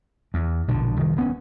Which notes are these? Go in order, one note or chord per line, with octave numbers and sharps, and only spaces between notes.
E2
A#1 B2 D3
C2 D#3
D#1 B3 C#4